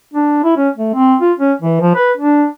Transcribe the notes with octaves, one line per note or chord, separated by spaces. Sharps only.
D4
E4
C#4
A3
C4
F4
C#4
E3
F3
B4
D4